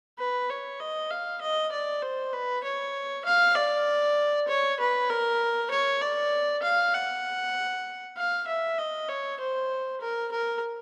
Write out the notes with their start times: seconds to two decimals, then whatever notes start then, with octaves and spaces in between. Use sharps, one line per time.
0.19 B4
0.50 C#5
0.80 D#5
1.10 F5
1.42 D#5
1.72 D5
2.03 C5
2.33 B4
2.64 C#5
3.25 F5
3.56 D5
4.48 C#5
4.80 B4
5.10 A#4
5.71 C#5
6.01 D5
6.63 F5
6.94 F#5
8.17 F5
8.47 E5
8.78 D#5
9.09 C#5
9.40 C5
10.01 A#4
10.32 A#4